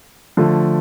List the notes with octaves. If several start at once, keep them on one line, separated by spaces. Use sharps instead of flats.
D3 F3 A3